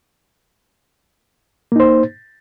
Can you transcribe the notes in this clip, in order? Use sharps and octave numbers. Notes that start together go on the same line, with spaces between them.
A#3 D#4 C5